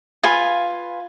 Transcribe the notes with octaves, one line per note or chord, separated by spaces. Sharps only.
F4 B4 F5 G#5